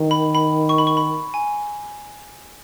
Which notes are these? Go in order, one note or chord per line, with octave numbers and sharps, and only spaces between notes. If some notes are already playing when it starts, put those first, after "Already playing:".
Already playing: D#3
B5
B5
C#6
B5
C#6
B5
G#5